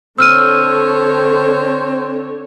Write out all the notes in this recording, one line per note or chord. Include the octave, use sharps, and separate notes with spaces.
D3 C4 A4 C#5 E6 F6 D#7